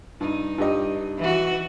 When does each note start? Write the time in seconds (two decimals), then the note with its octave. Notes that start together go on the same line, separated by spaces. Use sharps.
0.21 G2 D#4
0.58 G2 G4 D#5
1.19 E3 F#4